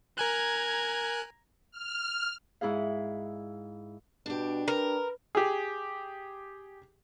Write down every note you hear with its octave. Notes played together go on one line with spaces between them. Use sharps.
A#4 G#5 A#5 F#6 G#6
F6
G#2 E4 G#4 F5
B2 D4 G4
A#4 B4
G4 G#4